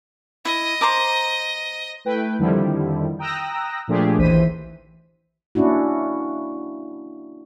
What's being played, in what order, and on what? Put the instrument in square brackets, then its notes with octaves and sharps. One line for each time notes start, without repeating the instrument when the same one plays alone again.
[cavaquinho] E4 [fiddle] D#5
[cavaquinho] C5 A#5 D6
[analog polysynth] A3 E4 B4 G5
F2 D3 D#3 F3 G3 E4
G5 A#5 D#6 E6 F#6 A#6
A#2 F3 A3 D4 G4 G#4
A1 D#2 E3 C5 B6 D#7
[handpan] A#3 C#4 D4 E4 F#4